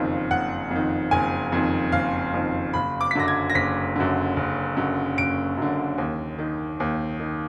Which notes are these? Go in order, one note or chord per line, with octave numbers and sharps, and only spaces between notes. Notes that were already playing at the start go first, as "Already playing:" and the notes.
Already playing: F#1 F2 D#3
F#1 F#5
F2 D#3
F#1 G#5
F2 D#3
F#1 F5
F2 D#3
F#1 B5
D6
B6
F#2 D3 A#6
G#6
A#6
F#1 B6
F#2 D3
F#1
F#2 D3
F#1 D7
F#2 D3
D#2
D#3
D#2
D#3